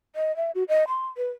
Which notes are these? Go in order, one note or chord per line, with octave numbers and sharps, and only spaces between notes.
D#5
E5
F#4
D#5
C6
B4